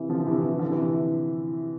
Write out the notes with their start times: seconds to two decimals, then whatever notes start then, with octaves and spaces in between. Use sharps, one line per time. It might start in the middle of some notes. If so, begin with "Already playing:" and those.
Already playing: C3 E3
0.09 D3 F3
0.27 C3 E3
0.43 C3 E3
0.59 D3 F3
0.71 C3 E3